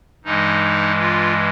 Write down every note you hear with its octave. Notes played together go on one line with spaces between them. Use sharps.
G2 E3 G#3 D#4
F4